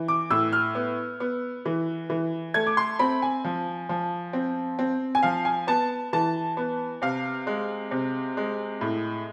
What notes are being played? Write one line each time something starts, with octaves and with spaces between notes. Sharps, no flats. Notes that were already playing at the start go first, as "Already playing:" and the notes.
Already playing: E3
D6
A2 E6
F6
B3
B3
E3
E3
A3 G#6
D6
C6
C4 B5
G#5
F3
F3
C4
C4
G#5
F3 F5
G#5
B3 A5
E3 A5
B3
C3 F5
G#3
C3
G#3
A2